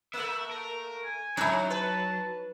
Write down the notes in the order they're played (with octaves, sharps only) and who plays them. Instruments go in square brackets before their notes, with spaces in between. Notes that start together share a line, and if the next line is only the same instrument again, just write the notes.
[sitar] A3 A#3 [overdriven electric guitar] E5
[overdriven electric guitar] A#4
[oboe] G#5
[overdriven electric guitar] F#3 [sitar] C#4 C#5 [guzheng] D#4 E4
[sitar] B4 [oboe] A5